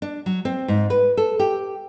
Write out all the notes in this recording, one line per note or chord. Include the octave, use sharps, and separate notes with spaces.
D4
F#3
C4
G#2
B4
A4
G4